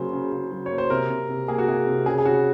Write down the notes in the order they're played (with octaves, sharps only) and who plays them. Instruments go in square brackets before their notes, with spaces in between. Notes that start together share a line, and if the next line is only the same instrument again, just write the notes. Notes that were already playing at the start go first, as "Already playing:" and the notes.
Already playing: [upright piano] C#3 F#3 A#3 C5
C#3
C#3
F#3
A#3 C#5
C5
C3 A#4
C3
C3
A#3 G#4
F#4
C3 G#4
C3
C#3 G#4
G#4
C#3 F#4